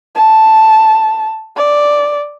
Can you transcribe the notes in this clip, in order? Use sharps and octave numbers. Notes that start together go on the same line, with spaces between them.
A5
D5